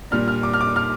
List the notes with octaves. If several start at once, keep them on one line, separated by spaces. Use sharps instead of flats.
A#2 G3 A#3 D4 F6
F6
D6
F6
D6
F6